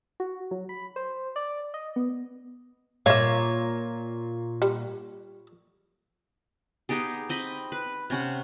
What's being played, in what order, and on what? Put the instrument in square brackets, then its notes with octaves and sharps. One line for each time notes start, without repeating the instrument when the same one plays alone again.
[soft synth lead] F#4
F#3
B5
C5
D5
D#5
B3
[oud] A#2 [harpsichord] C#5 [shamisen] E5 F5
[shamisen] G3
[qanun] B3 D#4 G4 G#4
C4 D#5 B5
B4
C3 C#4 F#5